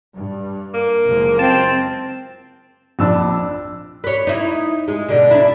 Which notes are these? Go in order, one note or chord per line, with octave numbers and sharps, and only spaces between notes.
G2
A#3
F#1 F3 G#3
C4 A5
A#1 F2 D4 B5 E6
B4 C#5
D#4 E4
G#3
B2 D3
D4 E4